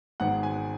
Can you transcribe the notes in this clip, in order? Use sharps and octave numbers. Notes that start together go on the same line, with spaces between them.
G#1 G#2 G#3 B3 F#5
G#5